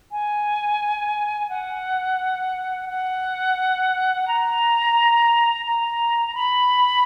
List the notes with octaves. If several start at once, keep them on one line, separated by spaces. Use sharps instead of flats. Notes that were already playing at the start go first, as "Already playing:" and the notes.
G#5
F#5
F#5
A#5
A#5
B5